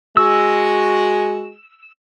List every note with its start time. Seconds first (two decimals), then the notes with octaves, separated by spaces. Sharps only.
0.17 G#3 F#4 E6